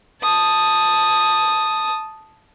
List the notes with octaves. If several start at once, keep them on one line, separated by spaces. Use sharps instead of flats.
A5 D#6